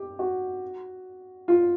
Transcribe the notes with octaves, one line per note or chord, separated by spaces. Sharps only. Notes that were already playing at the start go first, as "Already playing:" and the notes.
Already playing: G4
F#4
F4